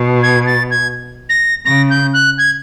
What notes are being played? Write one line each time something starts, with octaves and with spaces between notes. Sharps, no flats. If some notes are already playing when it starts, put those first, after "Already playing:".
Already playing: B2
G#6
A6
G#6
A#6
C#3 A#6
G6
F#6
G#6